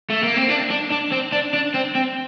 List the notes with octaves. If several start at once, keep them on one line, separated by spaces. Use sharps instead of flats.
A3
A#3
C4
D4
D4
D4
C4
D4
D4
C4
C4